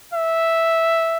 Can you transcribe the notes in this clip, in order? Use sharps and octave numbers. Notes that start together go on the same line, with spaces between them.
E5